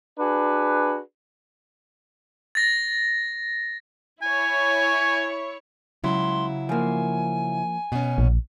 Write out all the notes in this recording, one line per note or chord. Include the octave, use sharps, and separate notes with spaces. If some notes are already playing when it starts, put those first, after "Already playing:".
D4 F#4 G#4 B4
A6 A#6
E4 C#5 G#5
C#2 C#3 F#3 E4 C6
F3 A#3 G#5
B2 C#4
A#1